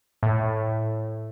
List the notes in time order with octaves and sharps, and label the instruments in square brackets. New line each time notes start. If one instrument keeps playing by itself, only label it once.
[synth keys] A2